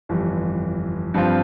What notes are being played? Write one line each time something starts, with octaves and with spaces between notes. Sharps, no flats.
G1 F2 E3 G3
G2 F3 C4 F4